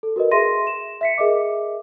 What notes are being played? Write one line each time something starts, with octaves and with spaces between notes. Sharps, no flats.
A4
F#4 A#4 B4 D#5
G#4 E5 C6 A#6 D#7
E7
E5 B6 C#7
G#4 A#4 D#5 E5 D6